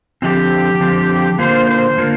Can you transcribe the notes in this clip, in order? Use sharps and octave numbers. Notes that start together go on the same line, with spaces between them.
D3 F3 C4 G4
D3 F3 C4
D3 A#3 F4 A#4 C5
C5
D3 A#3 F4 A#4